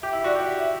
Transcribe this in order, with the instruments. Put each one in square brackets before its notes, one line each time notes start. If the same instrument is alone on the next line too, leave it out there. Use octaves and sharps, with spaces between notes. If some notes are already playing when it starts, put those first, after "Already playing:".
[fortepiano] G4 [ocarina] E5
[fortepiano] E4
[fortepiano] F#4 [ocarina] D5
[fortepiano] G4
[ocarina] E5